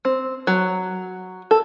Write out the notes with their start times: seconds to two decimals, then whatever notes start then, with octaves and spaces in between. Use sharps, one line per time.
0.05 C4
0.47 F#3
1.51 A4